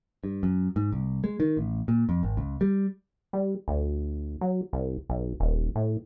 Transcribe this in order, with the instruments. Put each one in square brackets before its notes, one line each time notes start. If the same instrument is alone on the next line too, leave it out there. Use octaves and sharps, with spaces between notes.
[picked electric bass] G2
F#2
G#2
C2
G#3
D#3
A1
A#2
F2
G#1
C#2
G3
[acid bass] G3
D2
F#3
C2
B1
D#1
A2